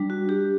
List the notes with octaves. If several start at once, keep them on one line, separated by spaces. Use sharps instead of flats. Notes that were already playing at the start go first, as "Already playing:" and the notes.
Already playing: G3 D4
F#4
G4